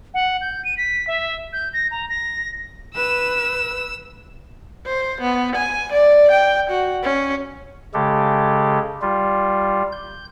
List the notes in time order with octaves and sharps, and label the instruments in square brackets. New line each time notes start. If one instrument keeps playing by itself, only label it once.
[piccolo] F#5
G6
D#7
B6
E5
G6
A#6
A#5
A#6
[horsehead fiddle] B4 [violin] E6 E7
[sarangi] C5
B3
G#5
D5
G5
F#4
C#4
[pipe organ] C#3 G#3 G4 A4
G3 F4
G6